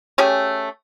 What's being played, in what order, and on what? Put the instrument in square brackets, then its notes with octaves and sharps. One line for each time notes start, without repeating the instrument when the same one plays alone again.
[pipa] A3 C#4 G4 G#4